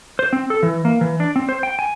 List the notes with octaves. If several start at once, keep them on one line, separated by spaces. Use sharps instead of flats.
C5
C4
A4
E3
A#3
E3
D4
C4
C5
G5
G#5